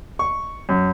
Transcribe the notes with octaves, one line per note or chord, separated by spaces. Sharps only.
C#6
F#2